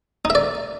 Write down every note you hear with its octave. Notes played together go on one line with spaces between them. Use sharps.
D#4
E5
D5